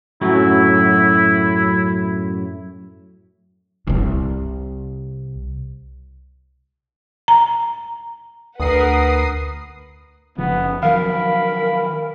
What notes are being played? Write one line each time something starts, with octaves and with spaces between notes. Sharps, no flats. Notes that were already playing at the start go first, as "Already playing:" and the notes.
F#2 A2 F#3 E4
C2 C3
A#5
D2 A#4 B4 F#5 D#6 C7
F#1 C#3 F3 B3
D#3 F3 F#3 A#4 F5 B5